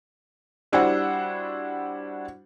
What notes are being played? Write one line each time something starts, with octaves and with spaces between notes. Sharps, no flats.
G3 D4 E4 F#4 C5 F#5